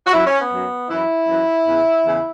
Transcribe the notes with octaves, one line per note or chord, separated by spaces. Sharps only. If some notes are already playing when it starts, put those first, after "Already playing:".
F#4
F#2 F#3 E4
C#4
B3
F#2 F#3
F#2 E3 E4
F#2 E3
E2 C#3 E3
E2 C#3 E3